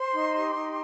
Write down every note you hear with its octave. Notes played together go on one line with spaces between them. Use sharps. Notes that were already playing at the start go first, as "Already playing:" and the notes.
Already playing: C5 C6
D#4
G4
D#4